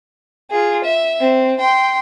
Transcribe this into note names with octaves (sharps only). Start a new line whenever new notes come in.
F4 G#4
E5
C4
G5 C6